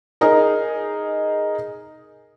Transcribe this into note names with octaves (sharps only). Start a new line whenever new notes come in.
D#4 G#4 A#4